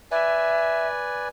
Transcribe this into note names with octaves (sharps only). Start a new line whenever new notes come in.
B4 D5 E5 G#5